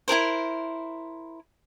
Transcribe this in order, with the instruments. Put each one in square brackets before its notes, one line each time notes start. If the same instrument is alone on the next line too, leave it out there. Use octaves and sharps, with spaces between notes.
[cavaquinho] E4 G#4 A#4 C5